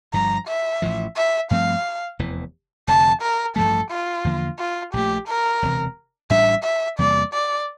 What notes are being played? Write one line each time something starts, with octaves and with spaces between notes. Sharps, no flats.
G1 G2 F3 A#5
E5
A1 A2 F3
E5
G2 F3 A3 C4 F5
F1 E2 E3
F1 F2 D3 A5
A#4
A1 G2 F3 A3 A4
F4
E2 D3 F3 A#3
F4
A#1 A#2 A3 G4
A#4
E1 D2 C3 E3
A1 A2 G3 D4 E5
E5
E2 C3 G3 A#3 D5
D5